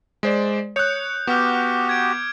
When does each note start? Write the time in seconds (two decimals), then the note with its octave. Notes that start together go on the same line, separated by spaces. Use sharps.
0.23 G#3 C5 D5
0.76 C#5 D#6 F#6 G6 C#7
1.27 B3 F#4 G4 D6 F6
1.89 G#6 D7